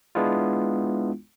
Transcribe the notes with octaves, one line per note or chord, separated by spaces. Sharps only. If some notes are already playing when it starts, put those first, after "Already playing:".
G#3 B3 D4 E4 F4